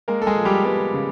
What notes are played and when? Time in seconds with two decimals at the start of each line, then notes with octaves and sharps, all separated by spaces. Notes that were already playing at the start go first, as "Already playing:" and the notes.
0.08 G#3 A#3 A#4
0.22 A4
0.27 G#3 G#4
0.37 F3
0.45 G3 G4
0.64 G3 B3 G4
0.94 C#3